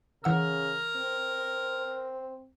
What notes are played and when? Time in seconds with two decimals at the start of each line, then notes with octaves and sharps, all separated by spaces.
0.24 C#3 E3 A#4 F#5 E6
0.96 C4